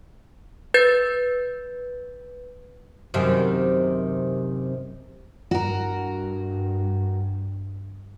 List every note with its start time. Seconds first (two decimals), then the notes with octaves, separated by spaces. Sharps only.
0.74 B4 G6 A6
3.14 F#2 C3 D#3
5.51 G2 F#4 A#4